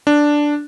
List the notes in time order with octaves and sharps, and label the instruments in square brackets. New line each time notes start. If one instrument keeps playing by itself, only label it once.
[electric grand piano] D4